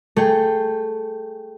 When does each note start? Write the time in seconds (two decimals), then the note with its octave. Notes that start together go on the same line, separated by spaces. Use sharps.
0.16 A3 G#4 G5